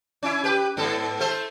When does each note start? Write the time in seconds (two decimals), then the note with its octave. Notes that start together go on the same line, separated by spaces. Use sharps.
0.23 C#4 E4
0.44 G4 B4
0.77 G#2 B3 A4
1.20 A3 A4 C5